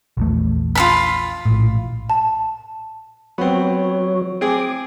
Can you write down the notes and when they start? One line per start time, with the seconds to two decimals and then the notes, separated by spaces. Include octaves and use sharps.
0.17 A#1 E2 A3
0.75 F4 A4 B5
1.46 A#1 A2
2.10 A5
3.38 F#3 B3 C4 C#5
4.41 C4 G#4 D6